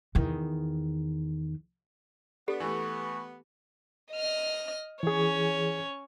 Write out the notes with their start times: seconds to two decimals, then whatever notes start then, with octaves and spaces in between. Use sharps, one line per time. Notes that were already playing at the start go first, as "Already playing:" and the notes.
0.15 E2 D#3
2.48 B3 D4 G4 A4
2.60 E3 A3 C#6
4.12 D#5 F6
5.03 E3 C#4 G#4 C#5